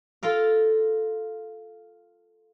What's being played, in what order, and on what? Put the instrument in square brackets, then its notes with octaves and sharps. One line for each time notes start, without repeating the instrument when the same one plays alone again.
[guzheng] F4 A4 A#4 F5